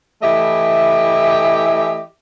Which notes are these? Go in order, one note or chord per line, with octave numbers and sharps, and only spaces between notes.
E3 A3 E4 G4 D#5 E5